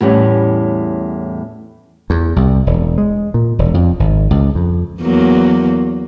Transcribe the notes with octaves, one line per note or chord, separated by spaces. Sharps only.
E2 A2 G3 C#4
E2
C2
E1
G#3
A#2
E1
F2
G#1
C#2
F2
E2 F#3 A#3